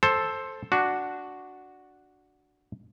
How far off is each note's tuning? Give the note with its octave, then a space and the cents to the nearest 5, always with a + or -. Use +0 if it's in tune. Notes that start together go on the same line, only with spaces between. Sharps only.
A4 +0 C5 +10
D4 +0 F#4 +0